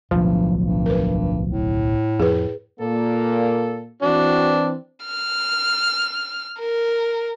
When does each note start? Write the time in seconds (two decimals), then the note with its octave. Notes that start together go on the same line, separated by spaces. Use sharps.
0.11 D1 B1 G2 F3
0.63 G2
0.86 A#4 B4
1.48 A2
2.20 F2 G#4 B4
2.80 A#2 A#3 A4
4.02 E3 C4 D4 F#4
5.05 F6
6.60 A#4